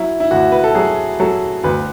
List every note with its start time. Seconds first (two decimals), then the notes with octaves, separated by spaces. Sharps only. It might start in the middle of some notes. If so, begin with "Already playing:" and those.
Already playing: F#3 E4
0.20 E4
0.31 D2 F#4
0.52 B4
0.64 A4
0.75 F#3 G#4
1.20 F#3 A4
1.64 D2 B4